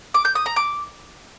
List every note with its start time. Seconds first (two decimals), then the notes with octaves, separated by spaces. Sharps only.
0.14 D6
0.25 G6
0.35 D#6
0.46 A#5
0.56 D6